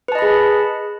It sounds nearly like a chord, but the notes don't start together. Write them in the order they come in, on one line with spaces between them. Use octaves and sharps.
B4 A5 D#5 B5 G#4